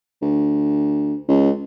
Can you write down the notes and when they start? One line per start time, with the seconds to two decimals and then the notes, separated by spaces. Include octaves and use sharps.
0.22 D2
1.28 C#2